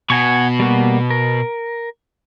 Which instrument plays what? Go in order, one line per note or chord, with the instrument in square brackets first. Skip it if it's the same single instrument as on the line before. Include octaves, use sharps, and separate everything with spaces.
[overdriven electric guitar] B2 [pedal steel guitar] F#5 G#5 C#6
[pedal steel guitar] G3 A#3 F#4
A#4